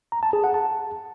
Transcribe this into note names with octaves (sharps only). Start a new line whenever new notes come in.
A#5
A5
G#4
F#5
A5